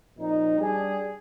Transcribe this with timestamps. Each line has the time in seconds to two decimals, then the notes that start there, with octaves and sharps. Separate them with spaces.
0.17 A#2 F3 C4 D#4
0.57 G3 D4 G#4